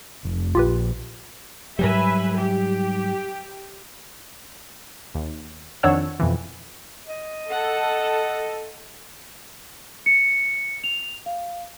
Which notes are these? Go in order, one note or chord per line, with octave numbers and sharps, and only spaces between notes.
F1
A#1 F4 G4 B4
G#2 F#3 G3 B4 E5 G#5
G4
D#2
F2 D#3 D4 C#5 F#5 E6
F2 B2 E3
D#5
A4 F#5
C#7
F7
F5